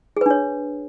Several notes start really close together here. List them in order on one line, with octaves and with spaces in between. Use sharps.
G#4 B4 D4 C#5